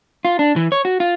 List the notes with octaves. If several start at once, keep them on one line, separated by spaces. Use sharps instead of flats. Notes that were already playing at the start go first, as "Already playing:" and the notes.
F4
D4
E3
C#5
F#4
F4